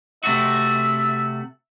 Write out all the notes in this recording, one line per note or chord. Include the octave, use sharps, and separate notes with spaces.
C3 A3 F#4 E5